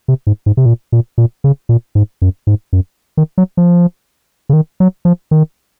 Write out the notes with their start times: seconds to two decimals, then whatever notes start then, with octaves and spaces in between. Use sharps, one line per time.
0.08 C3
0.27 G#2
0.46 G#2
0.57 C3
0.66 A#2
0.92 A#2
1.18 A#2
1.44 C#3
1.69 A#2
1.95 G#2
2.22 F#2
2.47 G#2
2.73 F#2
3.17 D#3
3.38 F#3
3.57 F3
4.49 C#3
4.53 D#3
4.80 F#3
5.05 F3
5.31 D#3